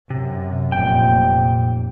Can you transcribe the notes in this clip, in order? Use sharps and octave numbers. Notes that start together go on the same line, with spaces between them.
F#2 C3
F1 A#2 G5